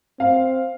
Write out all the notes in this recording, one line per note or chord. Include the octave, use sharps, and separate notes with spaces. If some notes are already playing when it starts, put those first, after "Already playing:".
C4 F5